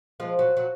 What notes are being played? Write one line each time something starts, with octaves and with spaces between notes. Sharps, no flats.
F3 G#3
F#3
F#3